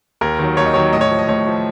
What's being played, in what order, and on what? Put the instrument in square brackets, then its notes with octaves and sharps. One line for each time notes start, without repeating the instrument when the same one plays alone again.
[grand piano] D#2 A#4
D#3 F#3
D#2 C#5
D#5
D#3 F#3 C#5
A2 D#5
C#5
F3
D#5
A2 C#5
F3